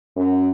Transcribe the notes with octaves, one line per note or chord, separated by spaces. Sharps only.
F#2